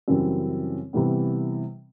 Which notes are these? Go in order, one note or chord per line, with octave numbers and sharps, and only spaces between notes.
F#2 C#3 E3 G3 C4
C3 E3 G3 B3